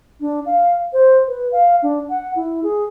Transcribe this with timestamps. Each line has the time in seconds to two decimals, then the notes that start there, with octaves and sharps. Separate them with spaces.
0.21 D4
0.46 F5
0.93 C5
1.28 B4
1.52 F5
1.83 D4
2.10 F#5
2.36 E4
2.63 G#4